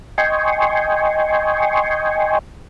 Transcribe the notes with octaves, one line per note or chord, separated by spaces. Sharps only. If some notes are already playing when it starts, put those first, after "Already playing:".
D#5 G5 G#5 C6 C#6